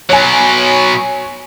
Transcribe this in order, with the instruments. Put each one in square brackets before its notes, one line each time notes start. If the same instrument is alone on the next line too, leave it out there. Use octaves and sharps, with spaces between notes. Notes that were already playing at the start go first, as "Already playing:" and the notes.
[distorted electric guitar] B2 F#3 [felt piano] C#5 G#5